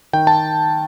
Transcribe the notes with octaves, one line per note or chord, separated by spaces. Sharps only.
D#3 G5
A5